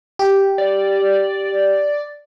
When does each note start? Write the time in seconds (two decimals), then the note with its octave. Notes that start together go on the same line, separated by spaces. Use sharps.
0.19 G4
0.58 D5